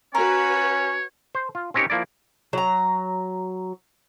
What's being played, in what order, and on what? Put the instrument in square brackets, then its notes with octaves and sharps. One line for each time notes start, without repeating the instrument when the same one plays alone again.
[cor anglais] C#4 [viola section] F#4 B4 [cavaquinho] A#4 [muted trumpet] C#5
[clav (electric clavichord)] C5
F4
C4 C#4 D#4 G4 A#4 C#5
F3 A#3 E4 D5
[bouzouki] F#3 A#5